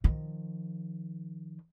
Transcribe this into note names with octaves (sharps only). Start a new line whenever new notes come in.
D#3 F3